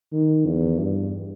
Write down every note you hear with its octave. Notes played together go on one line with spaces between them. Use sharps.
D#3
E2
G2